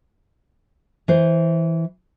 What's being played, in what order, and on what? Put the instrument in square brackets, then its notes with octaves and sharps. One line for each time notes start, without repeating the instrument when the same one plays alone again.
[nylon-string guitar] E3 C5